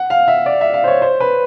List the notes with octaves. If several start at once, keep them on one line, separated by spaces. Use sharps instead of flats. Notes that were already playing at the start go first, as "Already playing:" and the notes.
Already playing: F#5
F5
E5
D5
E5
F5
C5
C#5
C5
B4